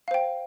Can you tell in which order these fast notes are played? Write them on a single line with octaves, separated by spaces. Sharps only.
F5 C5 G5